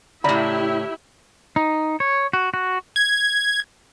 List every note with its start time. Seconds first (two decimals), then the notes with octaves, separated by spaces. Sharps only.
0.24 A2 C#3 E4 G4 D5 E5 A#5 B5
1.56 D#4
2.00 C#5
2.33 F#4
2.54 F#4
2.96 G#6